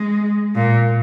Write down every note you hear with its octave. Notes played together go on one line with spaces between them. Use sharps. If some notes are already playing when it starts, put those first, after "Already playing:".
Already playing: G#3
A#2